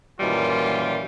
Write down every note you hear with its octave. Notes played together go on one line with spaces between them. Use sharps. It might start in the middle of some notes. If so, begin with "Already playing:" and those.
F#2 A#2 D#3 E3 G3 F4